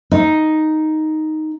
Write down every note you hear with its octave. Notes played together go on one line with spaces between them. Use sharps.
D#4